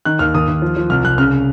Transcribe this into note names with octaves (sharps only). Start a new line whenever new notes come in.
D#3 F#6
D#2 F6
D#2 D#6
D#2
F3
F3
C2 F6
C2 F#6
C#3 F6